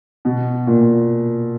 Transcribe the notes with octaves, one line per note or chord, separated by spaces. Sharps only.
B2
A#2